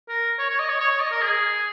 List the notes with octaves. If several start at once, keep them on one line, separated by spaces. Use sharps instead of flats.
A#4
C#5
C#5
D#5
C#5
C#5
C#5
D#5
A#4
G#4